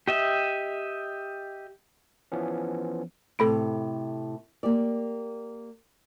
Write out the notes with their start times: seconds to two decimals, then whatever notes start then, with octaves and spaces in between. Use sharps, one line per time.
0.08 G4 D#5 E5
2.32 E3 F3 B3 C#4
3.39 A2 C3 A4 B5 D7
4.63 A#3 G4 D5